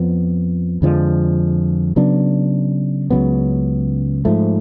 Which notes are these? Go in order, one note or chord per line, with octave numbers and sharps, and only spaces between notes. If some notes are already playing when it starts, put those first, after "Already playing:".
Already playing: F2 F3 B3
F2 D3 F3 G#3
C#3 F#3 B3 D4
C#2 C#3 F#3 B3
G#2 F3 A3